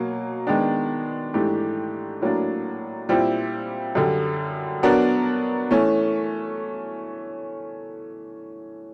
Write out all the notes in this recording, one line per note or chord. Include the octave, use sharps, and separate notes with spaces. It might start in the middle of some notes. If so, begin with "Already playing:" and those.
Already playing: B2 F#3 A#3
D#3 G#3 B3 D4
G#2 E3 A3 D4 G4
A2 F#3 A#3 D4
A#2 G3 C4 E4 G4
F#2 D3 G3
F#3 B3 D4 F#4 A#4
E3 A3 C#4